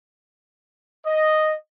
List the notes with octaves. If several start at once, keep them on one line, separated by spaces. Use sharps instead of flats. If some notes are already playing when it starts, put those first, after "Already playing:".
D#5